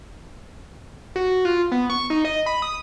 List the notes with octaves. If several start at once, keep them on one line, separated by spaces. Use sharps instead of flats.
F#4
F4
B3
C#6
D#4
D#5
B5
D#6